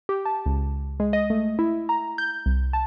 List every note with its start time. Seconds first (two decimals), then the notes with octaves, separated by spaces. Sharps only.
0.09 G4
0.25 A5
0.46 C#2
1.00 G#3
1.13 D#5
1.30 A3
1.59 E4
1.89 A#5
2.18 G6
2.46 C2
2.73 A5